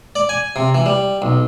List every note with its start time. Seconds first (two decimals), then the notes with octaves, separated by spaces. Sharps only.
0.16 D5
0.29 G#5
0.56 C3
0.75 E3
0.86 G3
1.22 B1